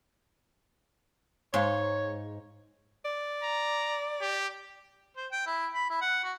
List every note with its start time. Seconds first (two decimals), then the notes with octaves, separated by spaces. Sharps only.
1.54 G#2 D#4 C#5 F5 C6
3.05 D5
3.43 A#5
4.21 G4
5.17 C5
5.32 G5
5.46 E4
5.74 B5
5.90 E4
6.02 F#5
6.24 F#4